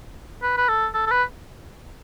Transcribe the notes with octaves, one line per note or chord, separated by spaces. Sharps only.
B4
B4
A4
A4
A4
B4